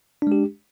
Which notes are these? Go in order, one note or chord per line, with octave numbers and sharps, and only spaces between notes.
G#3 D4 G4